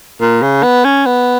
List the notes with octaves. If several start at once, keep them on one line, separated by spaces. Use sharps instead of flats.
A#2
C#3
B3
C#4
B3